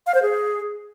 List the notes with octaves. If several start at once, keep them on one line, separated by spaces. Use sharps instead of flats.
F5
C5
G#4